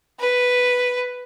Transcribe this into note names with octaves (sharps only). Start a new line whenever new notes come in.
B4